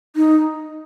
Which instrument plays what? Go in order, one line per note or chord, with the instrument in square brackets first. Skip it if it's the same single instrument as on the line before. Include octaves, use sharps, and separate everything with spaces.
[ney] D#4